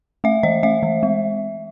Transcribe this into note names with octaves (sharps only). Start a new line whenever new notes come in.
A3 E5
E3 D#5
A3 E5
E3
G#3